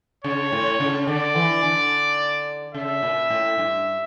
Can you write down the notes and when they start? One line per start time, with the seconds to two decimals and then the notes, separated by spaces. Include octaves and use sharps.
0.24 C#3 C#5
0.52 A2
0.80 C#3
1.07 D3 D5
1.36 E3
1.63 D3
2.74 C#3 E5
3.03 A#2
3.30 A2
3.58 G2